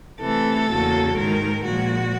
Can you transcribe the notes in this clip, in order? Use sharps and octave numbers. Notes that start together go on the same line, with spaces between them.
C3 E3 A3 A4
E2 C#3 F#3 A#3
G#2 D#3 G#3 A#4
A#2 F3 G#3 F#4